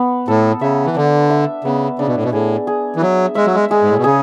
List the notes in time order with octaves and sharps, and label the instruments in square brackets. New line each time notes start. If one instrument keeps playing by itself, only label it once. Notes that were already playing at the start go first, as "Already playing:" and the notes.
Already playing: [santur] B3
[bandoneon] A2 [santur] A4
[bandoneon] C#3 [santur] E5
[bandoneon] E3
[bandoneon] D3 [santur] D4
[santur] E5
[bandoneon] C#3 [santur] B3
[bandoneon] C#3 [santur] D4
[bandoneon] B2
A2
B2
[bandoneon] A2 [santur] G#4
[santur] G#4
[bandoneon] E3
[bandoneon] F#3 [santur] E5
[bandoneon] G#3 [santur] E5
[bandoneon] F#3
G#3
[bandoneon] G#3 [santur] G#4
[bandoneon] G#2
A2
B2
[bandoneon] C#3 [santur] G#4